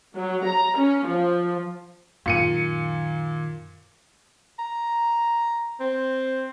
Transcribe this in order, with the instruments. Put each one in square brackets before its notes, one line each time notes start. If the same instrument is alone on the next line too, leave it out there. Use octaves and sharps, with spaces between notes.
[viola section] F#3
A#5
C#4
F3
[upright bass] F#2 D#3 [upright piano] A#2 C#7 D#7
[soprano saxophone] A#5
C4